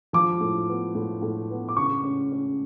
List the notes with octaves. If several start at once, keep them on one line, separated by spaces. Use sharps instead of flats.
F3 D6
A2
B3
A2
A2
B3
D6
C#3 C#6
C#4
C#4